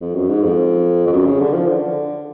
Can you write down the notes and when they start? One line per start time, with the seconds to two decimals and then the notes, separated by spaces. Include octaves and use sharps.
0.01 F2
0.15 F#2
0.29 G#2
0.43 F2
1.07 F2
1.12 F#2
1.26 C#3
1.40 D3
1.54 F3
1.68 D3